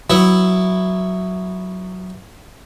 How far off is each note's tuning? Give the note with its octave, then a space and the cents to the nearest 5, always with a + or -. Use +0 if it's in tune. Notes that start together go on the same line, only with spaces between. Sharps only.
F#3 +0 B3 +0 E4 +0